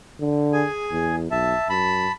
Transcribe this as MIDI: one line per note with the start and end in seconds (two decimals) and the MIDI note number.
0.20 0.64 50
0.53 1.15 68
0.53 1.15 80
0.92 1.29 40
1.31 1.54 35
1.31 1.68 76
1.31 1.68 81
1.69 2.07 42
1.69 2.12 81
1.69 2.12 83